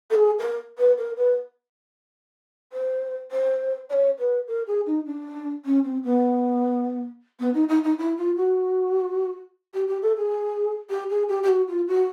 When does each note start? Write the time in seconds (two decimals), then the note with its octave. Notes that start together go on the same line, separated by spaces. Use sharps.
0.10 A4
0.15 G#4
0.39 A#4
0.78 B4
0.98 A#4
1.17 B4
2.73 C5
3.31 C5
3.90 D5
3.93 C#5
4.19 B4
4.48 A#4
4.67 G#4
4.86 D#4
5.06 D4
5.65 C#4
5.84 C4
6.04 B3
7.40 B3
7.54 D#4
7.69 D#4
7.83 D#4
7.98 E4
8.18 F4
8.36 F#4
9.74 G4
9.88 G4
10.02 A4
10.17 G#4
10.90 G4
11.10 G#4
11.29 G4
11.43 G4
11.48 F#4
11.68 F4
11.88 F#4